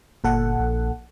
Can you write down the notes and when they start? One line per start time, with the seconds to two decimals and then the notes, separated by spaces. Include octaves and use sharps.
0.24 G1 A#2 A4 F#5
0.59 A#1